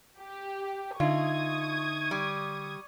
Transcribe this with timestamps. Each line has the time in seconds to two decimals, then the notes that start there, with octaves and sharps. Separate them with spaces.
0.18 G4
1.00 D3 D#4 F4 E5 C#6 D#6 G#6
2.11 G3